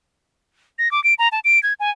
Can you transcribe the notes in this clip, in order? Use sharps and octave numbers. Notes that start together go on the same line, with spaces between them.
A#6
D6
D7
A#5
A5
D7
G#6
G#5